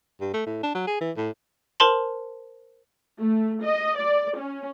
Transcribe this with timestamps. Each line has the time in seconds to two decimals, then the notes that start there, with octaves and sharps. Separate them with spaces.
0.21 G2
0.34 A3
0.46 A2
0.63 D4
0.75 F#3
0.87 G#4
1.01 E3
1.17 A2
1.80 A#4 C5 A5 C6 F#7
3.20 A3
3.64 D#5
3.97 D5
4.37 C#4